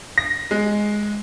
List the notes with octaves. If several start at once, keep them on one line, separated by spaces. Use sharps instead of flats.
A#6
G#3